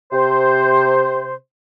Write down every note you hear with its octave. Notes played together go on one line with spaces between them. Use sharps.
C3 C5